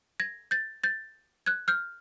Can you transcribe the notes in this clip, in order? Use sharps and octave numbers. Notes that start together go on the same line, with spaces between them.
G#6 A#6
G6 A6
G6 A6
F#6 G#6
F6 G6